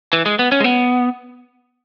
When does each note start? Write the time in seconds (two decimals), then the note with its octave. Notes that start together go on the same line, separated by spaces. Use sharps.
0.13 E3
0.26 G#3
0.39 B3
0.52 C#4
0.60 G#3
0.64 B3